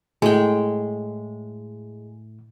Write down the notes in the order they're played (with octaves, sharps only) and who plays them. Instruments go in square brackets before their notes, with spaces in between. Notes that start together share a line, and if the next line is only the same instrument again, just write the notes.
[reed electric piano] A2 [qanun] G#3 G5